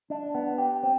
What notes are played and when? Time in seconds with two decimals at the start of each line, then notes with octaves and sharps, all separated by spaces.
0.10 D4
0.35 B3
0.58 G4
0.83 C4